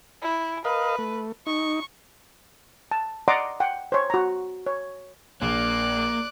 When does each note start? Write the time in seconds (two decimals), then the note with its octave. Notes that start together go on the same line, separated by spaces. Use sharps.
0.22 E4
0.65 A#4 B4 D#5 F5
0.99 A3
1.47 D#4 C#6
2.91 A5
3.28 D5 D#5 F#5 A#5 C6 D6
3.60 F#5 G5
3.92 C5 C#5
4.10 F#4 A#5
4.66 C#5
5.42 A#1 A#3 D5 F#6